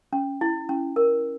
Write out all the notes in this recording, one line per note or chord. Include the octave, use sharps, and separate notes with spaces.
C#4
E4
C#4
A#4